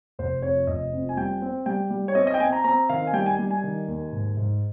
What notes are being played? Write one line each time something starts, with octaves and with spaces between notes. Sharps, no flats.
F1 C5
F2 C#5
F1 D#5
F2
G#5
G3 G5
C4
G3 G5
G3
C#5
C4 D#5
D#5
G5
C4 G#5
A#5
C4 A#5
D#3 F5
G#5
G3 G5
G#5
G3
G#5
D#3
D#2
G#2
G#2